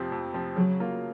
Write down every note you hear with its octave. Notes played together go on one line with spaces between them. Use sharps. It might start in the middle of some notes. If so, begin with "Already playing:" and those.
Already playing: F2 C3 F3 C4
F2
C3 F3 C4
C#3 F#3
F#3 A#3 F4